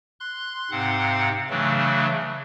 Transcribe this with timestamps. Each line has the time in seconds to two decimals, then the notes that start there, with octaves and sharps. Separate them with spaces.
0.20 C6 F#6
0.71 G#2 C3 C4 F5 F#5
1.50 C#3 E3 F#3 A3 D4